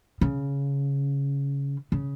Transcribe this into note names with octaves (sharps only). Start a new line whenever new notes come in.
C#3
C#3